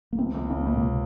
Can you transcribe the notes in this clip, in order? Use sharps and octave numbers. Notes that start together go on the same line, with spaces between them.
A#3
C#2 C4
C#2
C#2 C4
C#2 A#3
A#2
C3